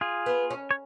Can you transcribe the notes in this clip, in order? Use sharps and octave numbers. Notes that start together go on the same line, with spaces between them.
F4 G#4
B3
C#4
C#5